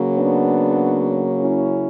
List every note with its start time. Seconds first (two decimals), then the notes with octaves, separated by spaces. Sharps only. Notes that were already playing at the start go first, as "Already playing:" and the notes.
Already playing: C#3 F#3 A#3
0.14 B3 D4
1.40 C#4 E4